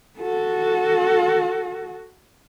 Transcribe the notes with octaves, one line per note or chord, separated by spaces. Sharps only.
F#4 A4